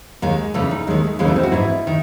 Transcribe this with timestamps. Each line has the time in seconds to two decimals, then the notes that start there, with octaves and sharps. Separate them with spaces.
0.22 D#2 D#3 G#3
0.54 E2 C#3 E3 A3
0.71 D#4
0.87 D#2 D#3 G#3
1.04 A3
1.19 D#2 C#3 E3 G#3
1.28 A3
1.36 C4
1.43 F#4
1.52 G#2 E3 E4
1.87 D#3